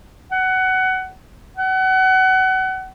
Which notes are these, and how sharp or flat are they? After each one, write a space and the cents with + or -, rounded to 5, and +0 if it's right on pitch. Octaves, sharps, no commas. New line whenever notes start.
F#5 +20
F#5 +30